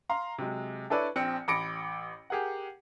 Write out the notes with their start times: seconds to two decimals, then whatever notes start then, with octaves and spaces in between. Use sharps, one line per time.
0.09 F5 A#5 C6
0.39 C3 F#3 G#3
0.90 D4 E4 A4 B4 C#5 D5
1.16 A#1 C4 C#7
1.48 A1 B5 D6 A#6 C#7 D7
2.30 G4 G#4 A#4 F#5